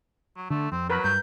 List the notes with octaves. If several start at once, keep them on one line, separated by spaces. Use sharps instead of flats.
F#3
D3 A3
F2 C4
F#3 A#4 B4 B5
G2 G6